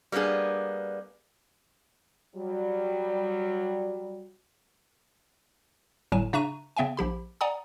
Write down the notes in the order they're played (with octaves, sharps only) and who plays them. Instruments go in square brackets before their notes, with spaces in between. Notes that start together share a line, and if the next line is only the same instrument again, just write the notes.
[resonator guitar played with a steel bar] G3 A#3 B3 D4 G#4
[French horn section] F#3 G3
[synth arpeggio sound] G1 A2 D3 F#3 G#5 E7
C#3 D4 E5 A#5 C#6 D#7
C#3 B3 E5 G5 G#5
A#1 F3 G4 B5
D5 F#5 G#5 A#5 D#6